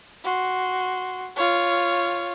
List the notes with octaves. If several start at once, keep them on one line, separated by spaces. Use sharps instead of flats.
F#4 C6
F4 C#5